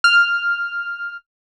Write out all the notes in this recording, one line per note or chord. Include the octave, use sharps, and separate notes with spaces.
F6